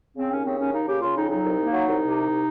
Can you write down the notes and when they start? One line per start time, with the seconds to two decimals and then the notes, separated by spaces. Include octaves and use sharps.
0.16 C#3 C4
0.30 D#2 C#4
0.45 C#3 C4
0.59 D#2 C#4
0.73 A#3 D#4
0.87 C#3 G4
1.01 C#3 F4
1.16 F2 D#4
1.30 F#3 D#4
1.44 C2
1.59 A#3
1.73 F#3
1.88 C2
2.01 C3
2.16 C2
2.30 C3